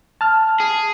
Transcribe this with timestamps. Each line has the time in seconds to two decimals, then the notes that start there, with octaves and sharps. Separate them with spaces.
0.21 A5 F6
0.60 G#4